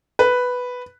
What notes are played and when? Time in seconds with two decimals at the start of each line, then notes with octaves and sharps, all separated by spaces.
0.19 B4